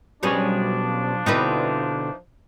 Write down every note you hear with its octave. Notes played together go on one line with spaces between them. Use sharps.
B1 B2 F3 G3 C#4 D4 G#4 C#5
B2 D3 C4 D#4 E4 B4